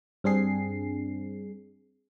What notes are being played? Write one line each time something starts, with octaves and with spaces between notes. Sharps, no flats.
G2 C4 D4 G#4 C7